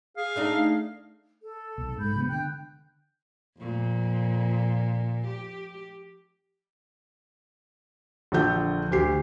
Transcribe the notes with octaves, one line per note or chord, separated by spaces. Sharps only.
G#4 F5
A3 D4 D#4
A4
B1
G#2 B5 G6
C3 A3 B3
D3 G5 F#6 G6
F2 A#2
G4
A#1 D3 F#5 G6
D2 G4 C7